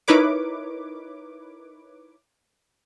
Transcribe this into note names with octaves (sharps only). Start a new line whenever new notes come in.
D#4 E4 A#4 B4 C#5 D6